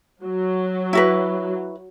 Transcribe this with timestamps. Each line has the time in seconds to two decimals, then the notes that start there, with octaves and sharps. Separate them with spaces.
0.23 F#3
0.93 E4 F#4 B4